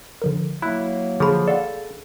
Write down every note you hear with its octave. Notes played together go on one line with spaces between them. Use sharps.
D3 F3 A#4
F#3 A#3 E4 B5 F#6
D3 F3 G#4 B5
A4 D5 F5 F#5